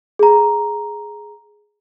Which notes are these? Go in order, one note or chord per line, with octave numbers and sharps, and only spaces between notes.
G#4 A#5